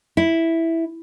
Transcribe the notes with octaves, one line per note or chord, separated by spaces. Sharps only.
E4